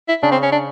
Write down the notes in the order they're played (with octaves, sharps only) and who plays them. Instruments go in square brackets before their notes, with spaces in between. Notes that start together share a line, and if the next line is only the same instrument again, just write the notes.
[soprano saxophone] E4
[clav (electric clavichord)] C#3 [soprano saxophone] D4
[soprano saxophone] C4
C#4
D4